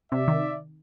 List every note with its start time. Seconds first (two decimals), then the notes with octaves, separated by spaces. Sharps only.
0.11 C3 D5 E5
0.28 D#3